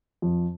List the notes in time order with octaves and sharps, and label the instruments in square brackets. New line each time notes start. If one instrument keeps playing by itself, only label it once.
[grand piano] F2